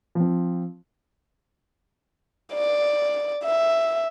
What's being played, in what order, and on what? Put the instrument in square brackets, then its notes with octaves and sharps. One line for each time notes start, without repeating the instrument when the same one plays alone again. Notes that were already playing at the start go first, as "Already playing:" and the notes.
[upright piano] F3 C4
[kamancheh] D5
E5